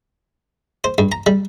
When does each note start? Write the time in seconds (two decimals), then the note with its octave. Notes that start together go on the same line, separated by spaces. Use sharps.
0.84 C5
0.98 G2
1.12 A#5
1.26 G3